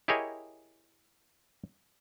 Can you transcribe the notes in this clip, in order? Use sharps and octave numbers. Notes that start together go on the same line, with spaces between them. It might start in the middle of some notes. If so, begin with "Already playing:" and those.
E4 G4 G#4 A#4 C#5 D#5